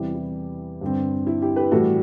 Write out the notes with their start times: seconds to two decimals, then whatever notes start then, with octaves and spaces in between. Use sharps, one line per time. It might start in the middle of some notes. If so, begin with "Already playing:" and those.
Already playing: E2 C3 E3 G3 E4 G4
0.14 E4
0.81 G2 D3 G3 C4
1.27 E4
1.42 E4 G4
1.56 G4 B4
1.71 A2 E3 G3 F#4 A4